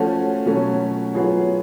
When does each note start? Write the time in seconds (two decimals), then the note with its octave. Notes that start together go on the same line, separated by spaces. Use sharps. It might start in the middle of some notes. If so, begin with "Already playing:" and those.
Already playing: F3 A3 C#4 F#4
0.46 B2 F#3 A3 C#4
1.14 F#3 B3 F4 G#4